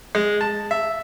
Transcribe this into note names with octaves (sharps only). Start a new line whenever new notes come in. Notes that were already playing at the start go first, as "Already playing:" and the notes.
G#3
A5
E5